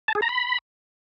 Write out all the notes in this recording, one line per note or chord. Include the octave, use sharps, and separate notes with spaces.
A5
G#4
A#5
B5